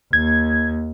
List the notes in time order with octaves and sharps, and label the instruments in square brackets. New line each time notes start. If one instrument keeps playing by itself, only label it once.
[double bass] D#2 [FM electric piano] G#6